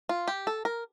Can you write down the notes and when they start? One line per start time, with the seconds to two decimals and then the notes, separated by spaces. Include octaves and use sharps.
0.09 F4
0.28 G4
0.47 A4
0.65 A#4